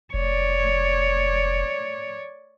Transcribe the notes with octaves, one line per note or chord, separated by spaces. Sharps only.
F1 C#5 D5